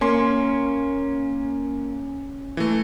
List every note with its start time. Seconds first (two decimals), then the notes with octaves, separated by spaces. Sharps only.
0.01 A#3 C#4 C6
2.57 E3 A3